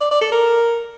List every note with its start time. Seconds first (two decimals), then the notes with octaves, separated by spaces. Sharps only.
0.01 D5
0.11 D5
0.22 A4
0.32 A#4